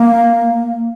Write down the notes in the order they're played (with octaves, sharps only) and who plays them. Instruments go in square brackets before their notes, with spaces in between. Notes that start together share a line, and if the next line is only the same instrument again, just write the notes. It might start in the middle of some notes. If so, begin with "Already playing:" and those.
Already playing: [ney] A#3